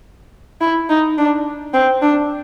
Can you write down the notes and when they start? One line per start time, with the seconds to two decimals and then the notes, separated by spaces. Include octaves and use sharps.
0.61 E4
0.89 D#4
1.18 D4
1.74 C4
2.02 D4